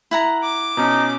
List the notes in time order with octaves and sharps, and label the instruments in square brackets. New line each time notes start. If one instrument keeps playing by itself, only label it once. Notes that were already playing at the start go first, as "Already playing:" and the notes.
[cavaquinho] E4 F#5 A#5
[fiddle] D6
[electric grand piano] B2 C#4 [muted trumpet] D#4